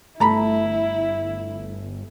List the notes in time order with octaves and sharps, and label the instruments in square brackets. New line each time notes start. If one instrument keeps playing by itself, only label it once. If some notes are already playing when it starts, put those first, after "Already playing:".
[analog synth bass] G1 [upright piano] A3 [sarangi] E4 [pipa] A4 A#5 B5